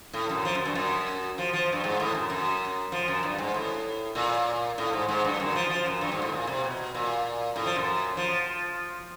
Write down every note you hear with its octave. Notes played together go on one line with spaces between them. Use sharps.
A2
F#2
F3
F#2
G2
F#2
F3
F3
G2
G#2
A2
F#2
F#2
F3
F#2
G2
G#2
A2
A#2
A2
G#2
G#2
G2
F#2
F3
F3
F#2
G2
G#2
A2
A#2
C3
B2
A#2
A2
F3
F#2
F3